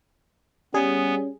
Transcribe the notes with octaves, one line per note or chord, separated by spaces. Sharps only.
G3 B3 C#4 G#4